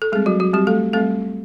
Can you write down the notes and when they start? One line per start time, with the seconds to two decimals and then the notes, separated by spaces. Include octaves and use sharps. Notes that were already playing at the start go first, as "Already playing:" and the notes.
0.02 A4
0.12 G3 G#3 G#4
0.15 C4
0.26 F#3 F#4
0.40 F#3 F#4
0.53 G3 C4 G4
0.67 A3 A4
0.93 G3 A3 C4 A4